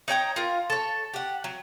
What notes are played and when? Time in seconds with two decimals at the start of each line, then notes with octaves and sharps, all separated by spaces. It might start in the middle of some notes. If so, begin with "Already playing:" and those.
0.08 D#4 C#5 G5 A#5
0.36 F4 A#4
0.70 A4 C#5
1.14 G4 F#5
1.44 F#3